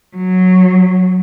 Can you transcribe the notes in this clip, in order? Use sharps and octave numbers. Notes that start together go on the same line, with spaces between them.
F#3